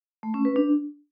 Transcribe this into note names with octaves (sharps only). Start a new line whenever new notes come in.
A3
C#4
B4
D4